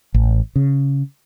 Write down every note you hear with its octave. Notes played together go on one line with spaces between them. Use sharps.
A1
C#3